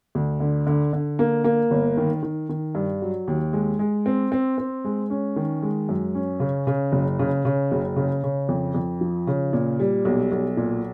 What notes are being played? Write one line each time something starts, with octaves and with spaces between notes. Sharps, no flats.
D2
D3
D3
D3
A#3
A#3
G1
D#3
D#3
D#3
G2
F#3
D#2
G#3
G#3
C4
C4
C4
G#3
C#4
D#3
G#3
F#2
C#4
C#3
C#3
F#1
C#3
C#3
F#1
C#3
C#3
F2
F2
F3
C#3
A#2
G3
B1
B1
A#2